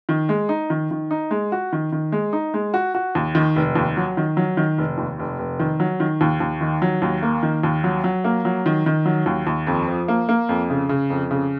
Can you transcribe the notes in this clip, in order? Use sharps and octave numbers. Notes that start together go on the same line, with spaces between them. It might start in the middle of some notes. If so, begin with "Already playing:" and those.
D#3
G#3
D#4
D#3
D#3
D#4
G#3
F#4
D#3
D#3
G#3
D#4
G#3
F#4
F#4
D#2
D#3
F1
D#2
F#3
D#3
F#3
D#3
F1
D#2
F1
F1
D#3
F#3
D#3
D#2
D#2
D#3
F#3
D#2
A#3
D#3
D#2
F#3
F#3
A#3
F#3
D#3
D#3
F#3
D#2
D#2
F2
F3
A#3
A#3
F2
C#3
C#3
F2
C#3